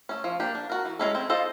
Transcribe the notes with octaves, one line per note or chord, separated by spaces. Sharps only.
A3 C#4
F3
A#3 D4 G4
D4
F#4 A#4
E3
G#3 C#4 E4 A4
C4
F4 A4 C5 D#5